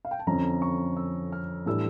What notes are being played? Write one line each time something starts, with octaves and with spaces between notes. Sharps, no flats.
F5
G5
A5
F2 D3 F3 C#4 A#5
C#6
E6
F6
A2 E3 G3 D4 E6